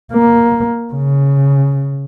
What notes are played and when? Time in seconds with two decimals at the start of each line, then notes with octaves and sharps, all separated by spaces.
0.13 A#3
0.93 C#3